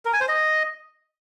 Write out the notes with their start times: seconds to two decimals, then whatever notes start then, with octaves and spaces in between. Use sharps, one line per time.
0.05 A#4
0.13 G#5
0.21 C5
0.28 D#5